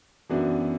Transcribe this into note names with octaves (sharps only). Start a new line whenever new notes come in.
F#2 E3 B3 D4 F#4